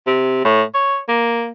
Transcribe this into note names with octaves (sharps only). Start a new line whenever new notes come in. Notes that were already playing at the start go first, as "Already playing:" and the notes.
C3
A2
C#5
A#3